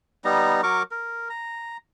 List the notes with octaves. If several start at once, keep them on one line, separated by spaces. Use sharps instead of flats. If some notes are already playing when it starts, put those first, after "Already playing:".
G3 B3 D#4 A#5
F#3 A#4 C#6 D6
A#4
A#5